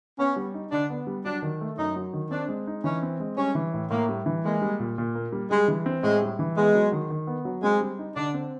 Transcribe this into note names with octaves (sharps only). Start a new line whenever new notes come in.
B3 C#4
G3
D#4
D3 D4
B3
G3
F#3 D4
D#3
A3
F#2 D#4
F#3
D#3
C4 D4
G#3
D#4
E3 C#4
C4
G#3
G3 C#4
E3
A2
A2 A#3
G3
E3
G#3 A#3
G3
A#2
A#2
A#3
G3
G3 G#3
E3
C4
A2 G#3
G3
E3
G#3 B3
F#3
D#3
D#3
B3
F#3
G#3 C4
G3
D#4
D3 D4
C4